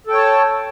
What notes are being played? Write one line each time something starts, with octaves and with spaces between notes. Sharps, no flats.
A4 C#5 G5 A5